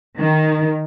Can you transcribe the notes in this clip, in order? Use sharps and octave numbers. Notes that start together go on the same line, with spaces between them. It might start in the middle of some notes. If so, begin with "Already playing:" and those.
D#3